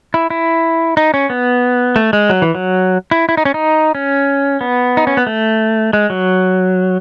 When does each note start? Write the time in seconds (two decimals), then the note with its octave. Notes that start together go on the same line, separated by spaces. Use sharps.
0.14 E4
0.30 E4
0.97 D#4
1.14 C#4
1.30 B3
1.96 A3
2.13 G#3
2.30 F#3
2.42 E3
2.55 F#3
3.11 E4
3.29 E4
3.37 D#4
3.45 C#4
3.54 D#4
3.95 C#4
4.61 B3
4.97 D#4
5.07 C#4
5.17 B3
5.27 A3
5.93 G#3
6.10 F#3